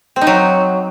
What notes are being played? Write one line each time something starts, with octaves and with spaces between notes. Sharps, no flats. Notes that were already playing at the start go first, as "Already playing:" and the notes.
C4
D#4
F#3